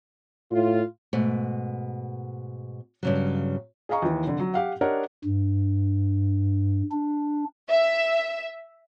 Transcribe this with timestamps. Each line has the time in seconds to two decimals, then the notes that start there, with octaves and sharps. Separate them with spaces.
0.51 A2 F4
1.13 G#2 B2 A3
3.03 G2 C#3 F#3
3.89 G#4 D#5 F5 A#5 C#6
4.02 D#2 E3
4.26 F1 D3
4.40 F#3
4.54 G4 F5 F#5
4.81 D4 G4 A#4 C#5 D#5 F#5
5.24 G2
6.91 D4
7.70 E5